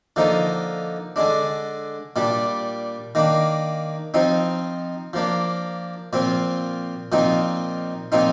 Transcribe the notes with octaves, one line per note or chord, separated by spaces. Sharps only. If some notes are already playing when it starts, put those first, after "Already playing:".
D3 F3 A#3 D#4
D3 G#3 D4
A#2 G3 D4
D#3 A#3 D4
F3 C4 D#4
F3 A#3 D4
A#2 F3 C4
A#2 F3 C4 D#4
A#2 F3 C4 D#4